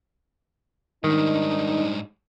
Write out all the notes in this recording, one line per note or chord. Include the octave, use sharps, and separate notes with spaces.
G#2 D#3 G3 D4 D#4